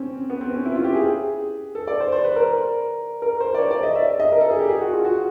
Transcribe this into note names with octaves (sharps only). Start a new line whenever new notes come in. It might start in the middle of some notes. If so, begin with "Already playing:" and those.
Already playing: C4 C#4
B3
C4
C#4
E4
F4
G4
G#4
A4
D5
C5
C5
B4
A#4
A#4
C5
D5
C#5
D5
D#5
E5
D#5
A#4
A4
G#4
G4
G#4
F#4
F4
F#4